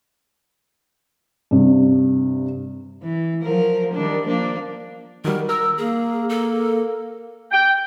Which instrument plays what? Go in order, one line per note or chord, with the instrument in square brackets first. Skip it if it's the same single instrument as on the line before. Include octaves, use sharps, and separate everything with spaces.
[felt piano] G2 C3
[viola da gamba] E3
F3 F#3 A#4
D#3 G3 D4
F3 A#3 D4
[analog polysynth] D#3 F#3 G3 [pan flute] A#4
[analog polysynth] A#4 [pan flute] E6
[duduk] A#3 [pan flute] G#4
[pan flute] A4
[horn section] G5